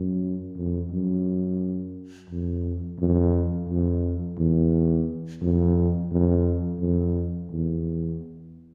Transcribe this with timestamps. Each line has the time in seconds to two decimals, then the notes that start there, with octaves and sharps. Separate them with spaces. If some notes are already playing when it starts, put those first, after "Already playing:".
Already playing: F#2
0.57 F2
0.91 F#2
2.29 F2
2.99 F2
3.69 F2
4.38 E2
5.42 F2
6.11 F2
6.80 F2
7.49 E2